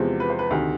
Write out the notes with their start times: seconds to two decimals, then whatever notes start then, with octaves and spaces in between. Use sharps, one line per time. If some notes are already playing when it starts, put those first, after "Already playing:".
Already playing: E2 C3 F3 G#3
0.20 B4
0.30 C5
0.39 B4
0.50 D2 C3 D#3